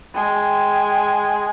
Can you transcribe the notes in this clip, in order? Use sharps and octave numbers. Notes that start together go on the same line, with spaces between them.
G#3 G5